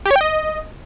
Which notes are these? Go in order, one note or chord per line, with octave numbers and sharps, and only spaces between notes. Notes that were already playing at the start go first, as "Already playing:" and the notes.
G4
C#5
G5
D#5